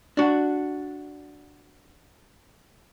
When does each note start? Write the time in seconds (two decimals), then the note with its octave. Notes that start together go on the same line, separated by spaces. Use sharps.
0.17 D4 F#4